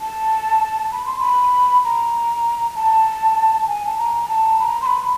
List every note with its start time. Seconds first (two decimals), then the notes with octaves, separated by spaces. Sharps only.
0.01 A5
0.92 B5
1.06 C6
1.19 B5
1.84 A#5
2.76 A5
3.67 G#5
3.86 A5
3.98 A#5
4.29 A5
4.60 B5
4.64 A#5
4.82 C6
4.86 B5